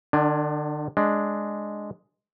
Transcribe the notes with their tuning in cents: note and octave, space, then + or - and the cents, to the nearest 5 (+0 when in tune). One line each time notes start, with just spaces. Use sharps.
D3 +40 D4 +0 G#5 +0
G#3 +0 D4 +0